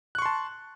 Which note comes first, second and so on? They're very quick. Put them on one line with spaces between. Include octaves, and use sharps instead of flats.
F#6 C#6 C6 A5